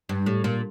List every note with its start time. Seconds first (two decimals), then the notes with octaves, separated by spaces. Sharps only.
0.09 G2
0.26 A2
0.44 A#2